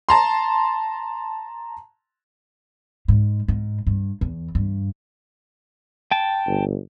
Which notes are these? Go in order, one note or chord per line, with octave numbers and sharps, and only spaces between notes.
A5 A#5 C6
G#2
G#2
G2
E2
G2
G5 A5
G1